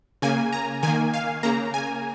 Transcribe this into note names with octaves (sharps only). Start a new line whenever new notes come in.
C#3 A#3 G#5
A#5
D#3 A#3 G#5
F5
C#3 A#3 A#5
G#5